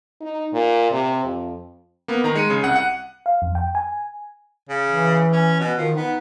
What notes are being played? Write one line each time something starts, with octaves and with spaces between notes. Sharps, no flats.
D#4
A#2
C3
F2
A#3 B3
D#3 A#5
G#3 C#7 D#7
C#3
C2 F#5
F#5
F5
F2
G5
G#5
C#3
E3
C#4
B2
D#3 F3
B3 D#4